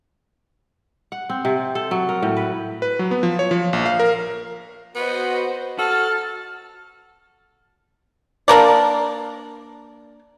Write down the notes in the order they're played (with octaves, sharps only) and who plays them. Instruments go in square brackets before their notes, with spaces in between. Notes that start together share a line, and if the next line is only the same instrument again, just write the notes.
[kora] F#5
C4
C3
A4
F#3
A#4
A2
B4
[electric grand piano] B4
F#3
B3
F3
C#5
F3
A#1
F5
A#4
[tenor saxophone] B3 [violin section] F#4 C5 D#5
[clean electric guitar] F#4 [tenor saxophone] A4 [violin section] A5 [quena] F6
[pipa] A#3 D4 A#4 D5